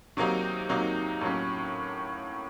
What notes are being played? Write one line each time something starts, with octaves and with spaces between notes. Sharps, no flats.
C3 D#3 F#3 A#3 D#4
C3 D#3 F#3 A#3 D#4
A2 F#3 A#3 C#4